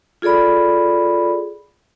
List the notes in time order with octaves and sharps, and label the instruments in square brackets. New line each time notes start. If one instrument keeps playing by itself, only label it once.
[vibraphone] F4 G#4 A4 D5 B5